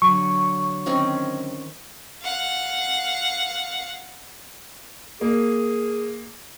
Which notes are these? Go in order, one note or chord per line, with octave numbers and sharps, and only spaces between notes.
D3 F#3 C#6
D#3 C4 C#4
F5 F#5
A#3 G#4